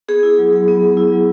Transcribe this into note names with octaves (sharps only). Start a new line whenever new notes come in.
B3 G#4
E4
F#3
F#3
B3
F#3
E4
F#3